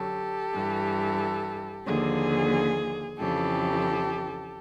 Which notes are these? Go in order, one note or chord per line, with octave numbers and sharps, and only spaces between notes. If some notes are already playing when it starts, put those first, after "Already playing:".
Already playing: F#2 D3 F#3 G4 A4
G2 E3
D#2 D3 F3 G#4
F2 C#3 E3 G4 A4